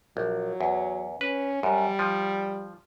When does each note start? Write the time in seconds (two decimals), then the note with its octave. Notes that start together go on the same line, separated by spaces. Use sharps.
0.17 A#1 F#3
0.61 E2
1.21 C#4 B4
1.63 F#2 G3
1.99 F3